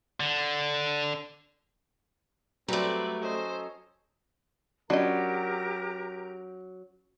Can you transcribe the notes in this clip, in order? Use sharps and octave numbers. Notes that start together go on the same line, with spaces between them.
D3
F#3 G3 A3 C4 B4 D5
C#4 A4 C5 D#5
F#3 C#4 D4 F4 G4 A#4 D#5 A#5